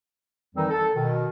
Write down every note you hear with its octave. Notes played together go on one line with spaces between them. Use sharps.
F2 D#3 E3 G3 C4 D#4
A4
B2 D#3